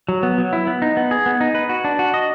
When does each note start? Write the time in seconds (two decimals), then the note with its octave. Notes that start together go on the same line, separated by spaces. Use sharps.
0.09 F#3
0.23 B3
0.38 F#3
0.53 E4
0.67 B3
0.82 D#4
0.97 B3
1.11 G#4
1.26 B3
1.41 D#4
1.55 B4
1.69 F#4
1.84 D4
1.99 F#4
2.14 D#5